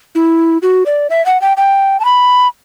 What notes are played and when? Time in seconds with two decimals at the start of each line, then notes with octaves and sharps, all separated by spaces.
0.15 E4
0.62 F#4
0.86 D5
1.10 E5
1.26 F#5
1.41 G5
1.57 G5
2.00 A5
2.05 B5